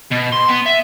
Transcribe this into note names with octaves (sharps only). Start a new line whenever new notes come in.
B2
C6
B3
E5